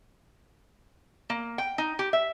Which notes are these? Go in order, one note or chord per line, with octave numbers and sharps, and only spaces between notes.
A#3
G5
D#4
G4
E5